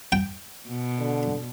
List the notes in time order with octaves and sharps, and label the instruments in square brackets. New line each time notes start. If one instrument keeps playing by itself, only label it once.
[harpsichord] G5
[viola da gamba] B2
[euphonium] D3